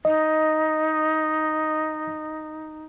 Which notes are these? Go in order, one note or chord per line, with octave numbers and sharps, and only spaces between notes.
D#4 D#5